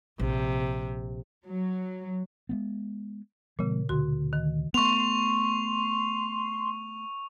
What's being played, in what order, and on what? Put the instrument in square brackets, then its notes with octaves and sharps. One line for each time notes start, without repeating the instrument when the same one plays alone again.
[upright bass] A#1 [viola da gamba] C3
[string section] F#3
[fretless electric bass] G#3 A3 B3
[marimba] A#2 C#3 [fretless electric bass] E3 G3 B3
[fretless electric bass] D2 B2 D3 [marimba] F#4 C6
[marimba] D#3
[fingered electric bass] A3 B3 [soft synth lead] C6 [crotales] C#6 F7